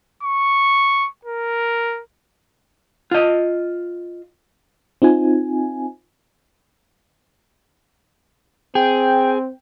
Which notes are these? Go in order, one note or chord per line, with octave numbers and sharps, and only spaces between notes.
C#6
A#4
F4 D#5
C4 D#4 F4 G#5
C4 G#4 G5